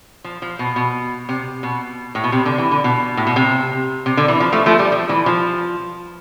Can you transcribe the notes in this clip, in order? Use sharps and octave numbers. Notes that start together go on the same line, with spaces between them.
F3
F3
B2
B2
C3
B2
A2
B2
C3
D3
E3
D3
B2
A2
B2
C3
C3
D3
E3
F3
F3 A3
F3 A3
G3
F3
E3
F3